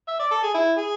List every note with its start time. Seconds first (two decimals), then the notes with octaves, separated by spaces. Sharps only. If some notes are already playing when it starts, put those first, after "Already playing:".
0.08 E5
0.19 D5
0.31 A4
0.43 G#4
0.54 E4
0.78 G#4